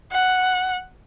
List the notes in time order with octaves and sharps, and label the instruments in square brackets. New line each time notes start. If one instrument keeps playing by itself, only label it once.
[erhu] F#5